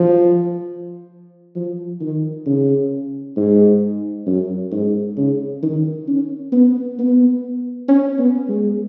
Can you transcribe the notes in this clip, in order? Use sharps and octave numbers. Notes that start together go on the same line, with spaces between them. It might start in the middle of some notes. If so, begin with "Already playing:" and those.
Already playing: F3
F3
D#3
C#3
G#2
F#2
G#2
C#3
D#3
C#4
B3
B3
C#4
B3
G#3